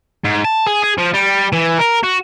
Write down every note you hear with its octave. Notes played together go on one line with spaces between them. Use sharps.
G#2
A5
G#4
G#4
F3
G3
E3
A#4
F#4